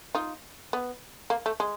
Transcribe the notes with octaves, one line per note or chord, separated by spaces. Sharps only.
D#4 F4
B3
A#3
A3
G#3